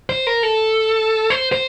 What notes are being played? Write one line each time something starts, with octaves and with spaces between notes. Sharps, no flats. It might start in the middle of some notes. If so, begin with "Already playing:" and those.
C5
A#4
A4
C5
C5